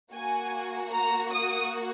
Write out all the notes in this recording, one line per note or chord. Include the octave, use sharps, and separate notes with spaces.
A#3 F#4 G#5
A#5
D#6